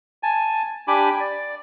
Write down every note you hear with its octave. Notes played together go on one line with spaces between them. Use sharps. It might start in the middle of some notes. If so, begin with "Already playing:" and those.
G#5 A5
D4 G4 G#5 B5 D6
D5